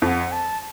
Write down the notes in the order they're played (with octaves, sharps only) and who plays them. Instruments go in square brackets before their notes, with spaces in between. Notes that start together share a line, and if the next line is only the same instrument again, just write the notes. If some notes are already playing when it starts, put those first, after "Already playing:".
[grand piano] F2 [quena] A5
[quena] F#5
A5